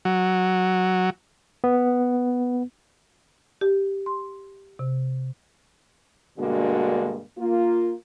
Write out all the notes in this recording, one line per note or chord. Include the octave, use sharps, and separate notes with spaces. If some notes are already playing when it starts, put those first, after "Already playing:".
F#3
B3
G4
C6
C3
G2 B2 D3 G#3 A#3 F#4
A#3 F4